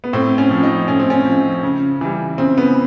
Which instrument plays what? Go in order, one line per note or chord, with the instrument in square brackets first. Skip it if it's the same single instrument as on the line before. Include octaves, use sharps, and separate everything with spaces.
[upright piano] B3
A2 C4
C#4
F3
D#4
A2 C#4
C4
C#4
F3
C#3
E3 G3
C#3 C4
B3